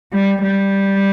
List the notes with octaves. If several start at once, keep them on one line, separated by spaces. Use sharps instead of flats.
G3
G3